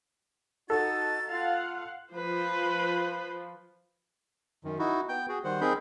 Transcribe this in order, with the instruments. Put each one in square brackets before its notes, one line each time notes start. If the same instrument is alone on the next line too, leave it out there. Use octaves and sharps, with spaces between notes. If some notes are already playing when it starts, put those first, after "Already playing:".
[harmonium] D#4 F#4 [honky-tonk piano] A4 [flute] A6
[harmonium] F4 [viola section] F5 F#5
[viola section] F3 [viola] B4 C5
[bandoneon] F#2 D#3
D#4 E4 F#4
B3 G5 G6
F#4 G#4
D#3 G3 C5 F#5
C4 D#4 G#4 A#4 B5 G6